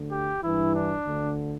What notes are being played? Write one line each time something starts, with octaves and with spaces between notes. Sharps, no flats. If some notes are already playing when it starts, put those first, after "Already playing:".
Already playing: D2 D3
G4
G2 E3 E4
D4
D2 D3